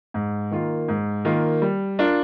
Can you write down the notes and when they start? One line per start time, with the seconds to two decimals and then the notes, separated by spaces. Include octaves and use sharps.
0.14 G#2
0.51 D#3 A#3 F4
0.88 G#2
1.25 D#3 A#3 F4
1.62 G3
1.99 D4 F4 A#4